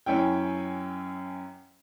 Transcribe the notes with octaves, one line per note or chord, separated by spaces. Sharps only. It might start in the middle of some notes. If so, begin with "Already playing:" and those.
F#2 C#4 E4 G5